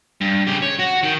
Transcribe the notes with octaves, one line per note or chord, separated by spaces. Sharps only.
G2
C#3 G4
C#5
F#4
D#3